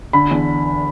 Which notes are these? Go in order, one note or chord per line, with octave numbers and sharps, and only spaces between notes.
D3 B5
E2